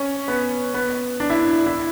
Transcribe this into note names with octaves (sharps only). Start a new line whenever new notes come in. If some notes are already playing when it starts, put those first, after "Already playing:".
Already playing: C#4
B3
B3
D4
E4
D4
E4